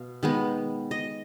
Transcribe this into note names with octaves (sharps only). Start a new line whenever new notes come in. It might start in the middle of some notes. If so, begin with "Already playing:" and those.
Already playing: B2 F5
D#3 G#3 B3
D#5